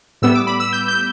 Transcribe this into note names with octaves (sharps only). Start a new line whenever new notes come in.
A2 G3 B3 E6
D6
B5
E6
G6
G6